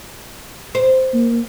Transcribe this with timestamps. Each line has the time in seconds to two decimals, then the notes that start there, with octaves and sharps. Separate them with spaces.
0.75 C5
1.14 A#3